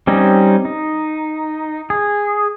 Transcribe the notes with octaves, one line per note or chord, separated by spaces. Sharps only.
G3 C4 C#4 D#4
D#4
G#4